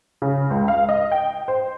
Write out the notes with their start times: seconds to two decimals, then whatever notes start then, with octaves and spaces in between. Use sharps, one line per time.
0.22 C#3
0.51 C#2
0.68 F5
0.89 D#5
1.12 G5
1.48 C5